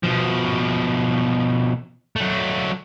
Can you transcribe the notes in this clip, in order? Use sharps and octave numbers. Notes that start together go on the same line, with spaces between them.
B2 F3
F#3 A3